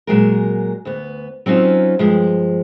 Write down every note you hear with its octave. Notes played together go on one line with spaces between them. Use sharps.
A#2 F#3 G#3 A#4
D2 B3
F#3 C4 C#4 D#4 F4
G2 F3 G#3